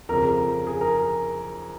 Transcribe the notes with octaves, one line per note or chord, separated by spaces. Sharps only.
F2 C#3 A#4
G#4
A#4